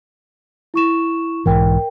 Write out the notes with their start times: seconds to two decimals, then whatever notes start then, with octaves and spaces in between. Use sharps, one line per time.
0.74 E4 C#6 E7
1.46 B1 G#2 E3 A#4 G5